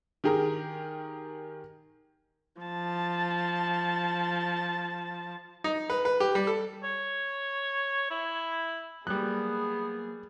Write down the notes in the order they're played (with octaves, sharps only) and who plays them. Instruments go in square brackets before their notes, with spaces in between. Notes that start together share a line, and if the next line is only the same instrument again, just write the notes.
[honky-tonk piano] D#3 G4 G#4 A#4
[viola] F3 A5
[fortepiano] D#4
B4
B4
G4
G3
A4
[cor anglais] C#5
E4
[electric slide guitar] F#3 A#3 [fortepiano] G3 F#6 [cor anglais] B3 [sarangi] G#4